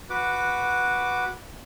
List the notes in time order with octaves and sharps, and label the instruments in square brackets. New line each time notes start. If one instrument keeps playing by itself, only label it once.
[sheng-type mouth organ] F#4 B4 D6